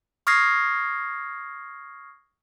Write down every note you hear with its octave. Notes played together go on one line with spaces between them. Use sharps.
C#6 D#6 F6 G#6 A#6 C7